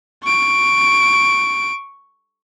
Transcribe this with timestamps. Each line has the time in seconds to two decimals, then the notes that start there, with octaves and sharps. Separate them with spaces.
0.23 C#6 D7